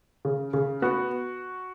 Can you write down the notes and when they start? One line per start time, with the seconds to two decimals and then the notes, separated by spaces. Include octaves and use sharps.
0.25 C#3
0.53 C#3
0.82 B3 F#4